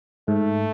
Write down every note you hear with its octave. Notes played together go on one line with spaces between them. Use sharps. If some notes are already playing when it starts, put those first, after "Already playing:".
G#2 A3